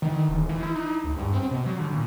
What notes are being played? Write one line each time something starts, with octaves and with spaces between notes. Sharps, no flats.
D#3
D#1
E3
E4
D#4
D2
G2
C4
B2
F#3
D3
A#2